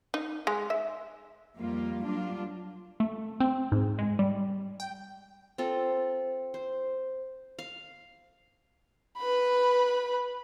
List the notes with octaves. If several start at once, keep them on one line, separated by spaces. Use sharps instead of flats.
D#4
G#3
E5
F2 G3 A#3 F4
F#3 G3 A#3 D4 F4
A3
C4
G#2
G#3
G3
G5
C4 F4 A4
C5
F5
B4 B5